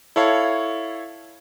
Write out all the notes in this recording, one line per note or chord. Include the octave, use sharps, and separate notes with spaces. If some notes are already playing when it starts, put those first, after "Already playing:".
E4 A4 C#5 F5